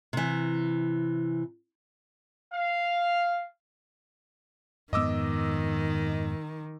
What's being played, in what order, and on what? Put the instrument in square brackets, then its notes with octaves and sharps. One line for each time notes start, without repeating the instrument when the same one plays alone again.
[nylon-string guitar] C3 E3
[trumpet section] F5
[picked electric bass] F2 G#2 B3 [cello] D#3 [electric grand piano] D#5 D6 E6